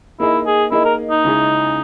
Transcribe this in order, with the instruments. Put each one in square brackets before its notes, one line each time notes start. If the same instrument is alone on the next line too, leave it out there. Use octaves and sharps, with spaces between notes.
[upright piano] A#3 D#4 G#4 D#5 [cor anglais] E4
[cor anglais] G#4
[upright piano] A#3 D#4 G#4 D#5 [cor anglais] E4
[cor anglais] A#4
D#4
[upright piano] C#3 G#3 C#4 E4 G#4